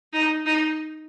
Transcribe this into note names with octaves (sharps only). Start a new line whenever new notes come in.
D#4
D#4